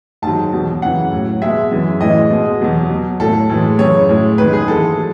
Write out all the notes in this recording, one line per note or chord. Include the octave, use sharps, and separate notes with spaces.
G#2 D#3 F#3 A5
E2 B2 F#3
F#2 C#3 E3 F#5
A2 F#3
B2 G#3 E5
F#2 E3 G#3
A2 E3 G#3 D#5
B2 G#3
E2 B2 F#3
B2 F#3
A2 F#3 A4
A2 E3 G#3
F#2 C#3 E3 G#3 C#5
A2 G#3
F#2 D#3 G#3 B4
G#4
G#2 E3 G#3 A4
F#3